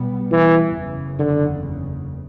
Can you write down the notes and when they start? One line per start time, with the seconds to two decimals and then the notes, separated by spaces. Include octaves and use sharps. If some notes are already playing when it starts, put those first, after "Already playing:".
Already playing: B1 B2 G3 B3
0.32 E3
0.75 F#1 E2 C#3
1.19 D3